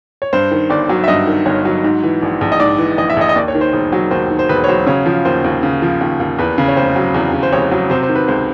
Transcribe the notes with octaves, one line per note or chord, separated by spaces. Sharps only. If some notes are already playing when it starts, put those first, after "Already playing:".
C#5
G2 C5
D#3
G1 D5
F#3
E5
G2 D#5
D#3
G1 C#5
F#3
G#2
E3
A#1
A#1
D#5
G#2 D5
E3
A#1 D#5
E5
A#1 D#5
D#5
D#2 D5
C#5
D#3
C5
E1
F#3
D#2 C5
D#3
C5
E1 B4
C#5
F#3 C5
C#3 C#5
F3
D#2 C5
D#2
C#3
F3
D#2
D#2
E2 B4
C#3
C#5
F1 C5
F#3
E2
C#3
C5
F1 C#5
F#3
C3 C5
C5
D#3
B4
C#2 C5